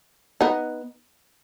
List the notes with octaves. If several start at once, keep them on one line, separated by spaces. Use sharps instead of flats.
B3 D#4